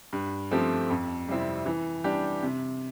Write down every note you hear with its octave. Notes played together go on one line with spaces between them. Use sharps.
G2
F3 A3 C4 G4
F2
C3 G3 C4 E4
E3
G3 D4 G4
C3